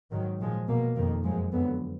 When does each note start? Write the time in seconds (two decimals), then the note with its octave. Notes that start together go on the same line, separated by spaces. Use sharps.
0.11 G#2 D#3 F#3
0.39 A#2 F3 G#3
0.67 B2 A#3
0.96 F2 D#3 A#3
1.24 F#2 F3 G#3
1.52 F2 D3 F#3 B3